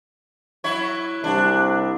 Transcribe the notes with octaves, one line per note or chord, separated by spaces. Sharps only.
F#3 E4 C#5
C2 D4